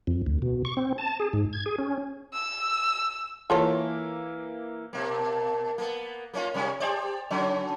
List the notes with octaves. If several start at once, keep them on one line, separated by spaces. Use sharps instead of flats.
F2
D2
B2
C#6
C4
A5
G#4
G#2
G#6
G#4
C#4
E6
E3 A#3 E4 F4 A4 C#5
B2 A#3
A#3 B3
A#3 C#4 F4
C3 G3 C#4
G4 C5 D5
C#3 F#3 C#4